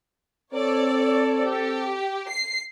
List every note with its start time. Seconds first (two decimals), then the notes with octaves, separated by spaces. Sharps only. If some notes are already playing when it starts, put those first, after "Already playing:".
0.54 C4 A4 C#5 D5
1.42 G4
2.29 C7